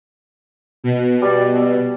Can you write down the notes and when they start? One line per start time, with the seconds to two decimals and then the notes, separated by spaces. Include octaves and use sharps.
0.84 B2
1.22 G3 D5
1.55 E6